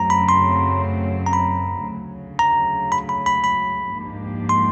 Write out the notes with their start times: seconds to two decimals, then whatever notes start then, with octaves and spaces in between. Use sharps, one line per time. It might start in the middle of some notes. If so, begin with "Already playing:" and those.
Already playing: F#2 C#3 F#3 A3 C4 A#5
0.10 B5
0.29 C6
1.26 A#5
1.33 B5
1.86 D2 C#3 F#3
2.39 A#5
2.92 B5
3.09 B5
3.26 B5
3.44 B5
3.97 G#2 F3 A#3 D4 G4
4.49 C6